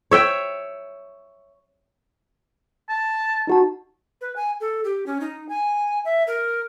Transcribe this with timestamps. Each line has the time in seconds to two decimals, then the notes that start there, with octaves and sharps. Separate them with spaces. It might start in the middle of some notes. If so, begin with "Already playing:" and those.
0.11 C#5 E5 G5
2.89 A5
3.47 D#4 F#4 A5
4.21 B4
4.36 G#5
4.61 A4
4.84 G4
5.06 C#4
5.21 D#4
5.49 G#5
6.05 E5
6.27 A#4